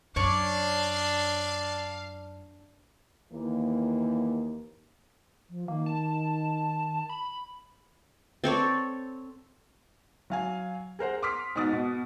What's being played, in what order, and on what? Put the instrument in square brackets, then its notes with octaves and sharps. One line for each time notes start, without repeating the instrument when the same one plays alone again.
[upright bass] F#2 [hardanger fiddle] D4 [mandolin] C#5 D5 [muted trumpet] F5
[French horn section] D#2 E3 A#3
[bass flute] F3
[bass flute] D#3 [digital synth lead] A#3
[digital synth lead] A5
B5
[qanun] C4 A4 C#5 D5
[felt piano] F#3 F5 G#5
G#4 A#4 C5 F#5
C6 D6 D#6 F6 B6
G#2 B2 D6 D#6 A6
B2